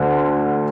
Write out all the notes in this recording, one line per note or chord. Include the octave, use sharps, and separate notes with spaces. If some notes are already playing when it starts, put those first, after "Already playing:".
Already playing: D2 D3